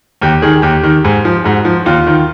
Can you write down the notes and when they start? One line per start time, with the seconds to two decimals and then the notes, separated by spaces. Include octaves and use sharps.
0.21 D#2 G4
0.42 D#3 G#4
0.62 D#2 G4
0.83 D#3
1.04 G#2
1.25 F3
1.44 G#2 F#4
1.65 F3
1.86 D#2 F4
2.07 D#3